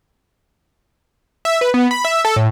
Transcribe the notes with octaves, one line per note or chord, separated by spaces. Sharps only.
E5
B4
B3
B5
E5
A4
A2